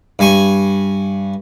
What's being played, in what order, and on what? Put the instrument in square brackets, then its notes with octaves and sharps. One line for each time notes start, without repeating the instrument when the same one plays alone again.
[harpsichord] G2 G#5 C#6